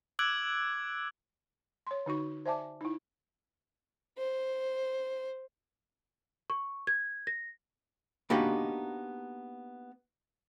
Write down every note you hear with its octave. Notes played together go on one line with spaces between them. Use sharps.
D6 E6 F#6 G#6 D7 F#7
C#5 C6
D3 D#4 F#4 C#6
C5 D5 E5 G#5 A5 D6
D#4 E4
C5
C#6
G#6
A#6
A#3 B3 D4 D#4 F#4 G4